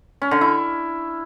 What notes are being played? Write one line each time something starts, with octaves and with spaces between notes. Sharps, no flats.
C#4
D3
E4